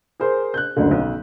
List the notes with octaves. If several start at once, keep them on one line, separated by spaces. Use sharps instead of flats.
G#4 A#4 C5
F#6 G6
F#1 D2 D3
B1